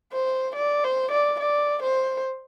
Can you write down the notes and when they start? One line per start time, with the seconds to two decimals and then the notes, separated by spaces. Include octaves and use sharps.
0.12 C5
0.56 D5
0.84 C5
1.11 D5
1.40 D5
1.83 C5